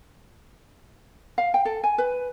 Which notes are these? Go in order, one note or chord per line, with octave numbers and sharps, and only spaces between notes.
F5
G5
A4
G#5
B4